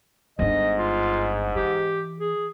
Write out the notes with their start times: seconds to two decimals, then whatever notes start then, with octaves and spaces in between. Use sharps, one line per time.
0.39 G1 G#2 D4 D#5
0.79 F4
1.56 E3 G4
2.20 G#4